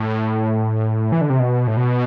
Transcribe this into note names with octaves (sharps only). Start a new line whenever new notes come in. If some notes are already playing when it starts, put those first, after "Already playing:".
Already playing: A2
E3
D3
C3
B2
A2
B2